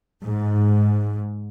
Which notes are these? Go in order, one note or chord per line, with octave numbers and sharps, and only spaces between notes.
G#2